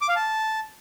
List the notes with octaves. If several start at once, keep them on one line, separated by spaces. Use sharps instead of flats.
D6
F5
A5